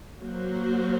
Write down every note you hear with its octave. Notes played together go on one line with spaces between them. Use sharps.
F#3 A#3 F#4 C5